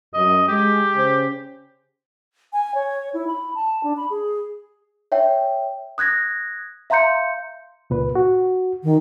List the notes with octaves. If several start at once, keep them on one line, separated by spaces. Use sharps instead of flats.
F#2 D#5
G#3 G4
C#3 C#4 C5
G#5
C#5
E4
B5
A5
D4
B5
G#4
C#5 E5 G5
D#6 F#6 G#6 A#6
E5 F5 A#5 C6 G6 C#7
C#2 A#2 B4
F#4
D#3